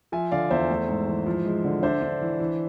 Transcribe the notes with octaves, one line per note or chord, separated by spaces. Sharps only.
F3 E5 G#5
D3 D5 F5
E2 C5 E5
A3
G#2
E3
F3
G#3
D3
D4 C5 E5
D4
E3
E3